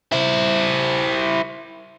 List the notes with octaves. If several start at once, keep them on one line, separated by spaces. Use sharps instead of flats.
E4 C5